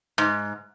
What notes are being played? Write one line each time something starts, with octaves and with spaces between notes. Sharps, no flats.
G#2